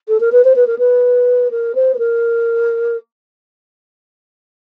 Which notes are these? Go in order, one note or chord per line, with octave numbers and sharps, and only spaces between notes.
A4
A#4
B4
C5
B4
A#4
B4
A#4
C5
B4
A#4